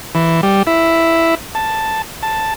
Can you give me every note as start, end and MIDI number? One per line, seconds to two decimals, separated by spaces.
0.15 0.41 52
0.43 0.63 55
0.67 1.35 64
1.55 2.02 81
2.23 2.54 81